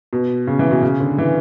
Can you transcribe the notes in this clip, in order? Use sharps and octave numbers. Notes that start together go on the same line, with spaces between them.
B2
C#3
E3
B2
C#3
D3
E3